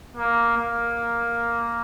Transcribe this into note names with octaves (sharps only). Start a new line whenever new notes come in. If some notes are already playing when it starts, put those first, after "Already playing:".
A#3
A#3